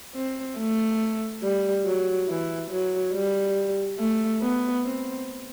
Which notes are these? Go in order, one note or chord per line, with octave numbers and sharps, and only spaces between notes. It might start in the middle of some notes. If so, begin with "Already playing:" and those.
C4
A3
G3
F#3
E3
F#3
G3
A3
B3
C4